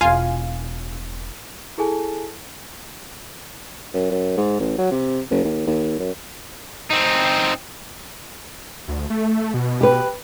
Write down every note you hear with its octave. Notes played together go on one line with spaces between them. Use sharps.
E1 F4 F5 G#5
E4 G#4 A4 G#5 A5
F#2
F#2
G#2
A1
F#3
C3
F#1
D#2
D#2
F#2
C4 D#4
D2
A3
B2
G4 B4